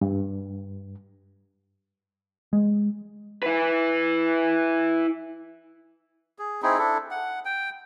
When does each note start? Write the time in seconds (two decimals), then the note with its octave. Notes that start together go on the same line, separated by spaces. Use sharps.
0.01 G2
2.53 G#3
3.43 E4 B4
6.39 G#4
6.62 C4 D#4 E4 G#4
6.78 D4 E4 A4
7.11 F#5
7.45 G5